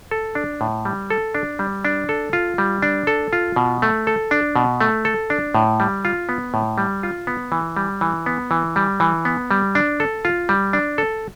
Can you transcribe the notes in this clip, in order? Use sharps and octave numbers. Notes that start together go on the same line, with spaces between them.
A4
D4
A2
G3
A4
D4
G3
D4
A4
F4
G3
D4
A4
F4
B2
A3
A4
D4
B2
A3
A4
D4
A2
G3
F4
B3
A2
G3
F4
B3
E3
G3
E3
B3
E3
G3
E3
B3
G3
D4
A4
F4
G3
D4
A4